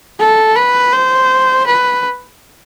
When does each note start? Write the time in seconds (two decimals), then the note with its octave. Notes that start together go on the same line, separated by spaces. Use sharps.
0.19 A4
0.56 B4
0.93 C5
1.67 B4